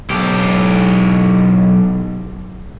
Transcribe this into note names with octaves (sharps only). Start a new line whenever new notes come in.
B1 G4